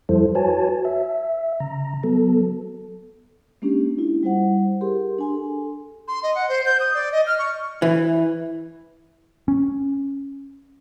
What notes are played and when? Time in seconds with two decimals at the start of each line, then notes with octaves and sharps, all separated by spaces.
0.09 F2 F3 G3 E4 A4 C5
0.35 F#4 B4 C#5 G#5 A5
0.85 E5
1.60 C#3 A#5
2.03 F#3 B3 A4
3.62 G#3 A#3 C#4 D4 G4
3.98 E4 F4
4.23 G3 E4 C5 F#5
4.81 G4 G#4 A#4 C6
5.18 D4 G#5 C6
5.34 A4
6.07 C6
6.23 D#5
6.34 F#5
6.48 C5
6.65 G6
6.80 D#6
6.94 D5
7.12 D#5
7.26 F6
7.38 C#6
7.82 E3
9.48 C#4